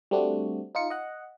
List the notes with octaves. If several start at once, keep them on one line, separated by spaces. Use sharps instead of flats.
G3 A3 C4 D4 F#4
D#4 F4 C#7
D#5 F#5